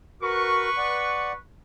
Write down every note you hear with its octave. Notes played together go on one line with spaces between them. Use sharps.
F#4 A#4 B4 C#6
D5 F#5